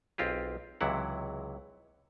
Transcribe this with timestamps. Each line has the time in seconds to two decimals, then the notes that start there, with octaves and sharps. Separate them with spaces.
0.18 B1 C4 F4 G4 G#4
0.81 C#2 C3 E3 F#3 E4 F#5